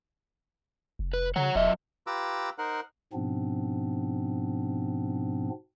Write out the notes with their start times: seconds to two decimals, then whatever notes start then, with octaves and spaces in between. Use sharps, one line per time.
0.99 F1
1.13 B4
1.36 C#3 C#5 F#5
1.55 E1 F#2 D#5 E5
2.07 F4 G4 B4 A#5 D6 E6
2.58 D#4 A#4 C5 F#5
3.13 G#2 B2 F3 B3 C4 D4